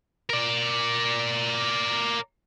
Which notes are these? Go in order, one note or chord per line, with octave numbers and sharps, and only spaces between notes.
A#4 D5